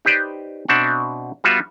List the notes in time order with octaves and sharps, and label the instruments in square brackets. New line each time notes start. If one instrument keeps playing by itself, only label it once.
[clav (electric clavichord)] D#4 G4 B4 C5 D5
B2 C4 D4 E5 F#5
G3 B3 F4 F#4 E5 F#5